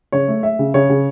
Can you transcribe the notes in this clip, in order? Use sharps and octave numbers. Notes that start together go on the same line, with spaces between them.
C#3 C#5
A3
A3 E5
C#3
C#3 C#5
C#3